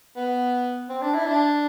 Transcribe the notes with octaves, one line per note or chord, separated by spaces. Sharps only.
B3
C4
D4
E4
D4